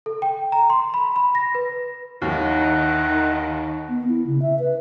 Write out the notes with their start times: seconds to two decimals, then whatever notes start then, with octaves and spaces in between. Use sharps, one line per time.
0.06 A4
0.22 G5
0.52 A#5
0.70 C6
0.94 B5
1.16 B5
1.35 A#6
1.55 B4
2.22 D#2 D#3 E4 F#5
3.89 B3
4.09 E4
4.27 C#3
4.42 E5
4.59 B4